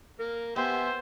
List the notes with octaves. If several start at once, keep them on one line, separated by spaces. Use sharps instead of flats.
A#3 A#4
B3 G4 C5 E5 G#5 C6